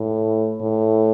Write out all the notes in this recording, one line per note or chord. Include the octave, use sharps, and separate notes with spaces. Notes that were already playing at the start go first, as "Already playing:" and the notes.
Already playing: A2
A2